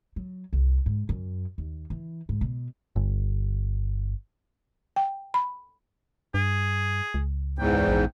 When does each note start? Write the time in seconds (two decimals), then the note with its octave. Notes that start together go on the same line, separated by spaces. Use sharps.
0.16 F#3
0.53 C2
0.86 G#2
1.09 F#2
1.58 D#2
1.90 E3
2.29 G#2
2.41 B2
2.96 G1
4.96 G5
5.34 B5
6.34 G2 G#4
7.14 C#2
7.59 E2 G#2 G5
7.88 A#1